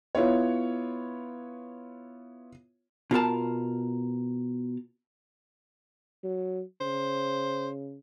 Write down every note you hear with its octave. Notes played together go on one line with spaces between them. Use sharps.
B3 E4 F4 C#5
B2 F4 A#4 A5
F#3
C#3 C5